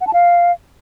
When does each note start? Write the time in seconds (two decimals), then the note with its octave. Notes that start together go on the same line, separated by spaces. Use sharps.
0.01 F#5
0.07 A5
0.13 F5